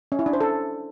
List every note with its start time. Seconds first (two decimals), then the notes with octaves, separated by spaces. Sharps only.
0.12 C#4
0.19 E4
0.26 D4
0.33 C5
0.41 A4